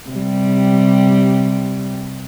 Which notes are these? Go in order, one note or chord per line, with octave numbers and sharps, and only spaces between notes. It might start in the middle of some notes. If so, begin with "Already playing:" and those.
C3 G3